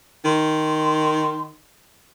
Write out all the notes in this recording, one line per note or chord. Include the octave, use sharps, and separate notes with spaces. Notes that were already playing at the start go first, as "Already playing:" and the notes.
D#3 C6